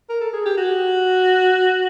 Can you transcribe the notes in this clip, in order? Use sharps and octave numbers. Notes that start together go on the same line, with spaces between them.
A#4
A4
G#4
G4
F#4